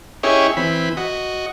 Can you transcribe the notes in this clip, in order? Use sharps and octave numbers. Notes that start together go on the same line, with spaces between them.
C#4 E4 G4 G#4 C#5 D#5
E3 C4 B5
F#4 D#5